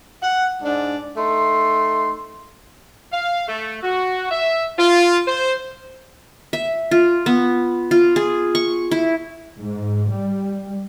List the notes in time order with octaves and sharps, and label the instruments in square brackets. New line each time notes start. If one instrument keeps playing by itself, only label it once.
[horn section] F#5
G#2 D4
A3 D#4 C6
F5
A3
F#4
E5
F4
C5
[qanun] E5
F4
B3
F4
G#4
C#6
E4
[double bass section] G#2
G3